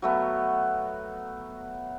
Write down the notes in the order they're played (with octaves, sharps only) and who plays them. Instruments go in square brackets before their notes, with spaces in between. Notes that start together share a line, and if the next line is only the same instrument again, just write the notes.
[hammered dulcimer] F#3 A3 B3